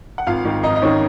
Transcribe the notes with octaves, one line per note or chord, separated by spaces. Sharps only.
F#5
G#1 F4 F5
G#2 D#3
G#1 D#4 D#5
D#5
G#2 D#3 C#4 C#5